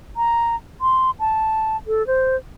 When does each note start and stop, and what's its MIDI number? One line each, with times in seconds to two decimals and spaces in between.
0.17 0.56 82
0.81 1.11 84
1.20 1.77 81
1.87 2.05 69
2.07 2.36 72